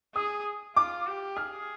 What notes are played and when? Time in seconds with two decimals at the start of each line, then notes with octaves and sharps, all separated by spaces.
0.15 G#4 D#6
0.76 F4 D6
1.07 G4
1.37 G#4 F6